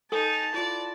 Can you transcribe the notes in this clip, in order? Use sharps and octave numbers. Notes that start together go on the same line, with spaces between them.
D#4 A4 G#5 A5
E4 F4 D5